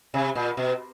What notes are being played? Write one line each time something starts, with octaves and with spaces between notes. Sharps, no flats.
C3
A#2
B2